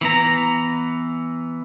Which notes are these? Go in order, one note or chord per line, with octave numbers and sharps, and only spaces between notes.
E3 B3 A#5